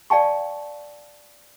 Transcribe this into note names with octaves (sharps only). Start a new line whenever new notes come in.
D5 F5 G5 A5 C#6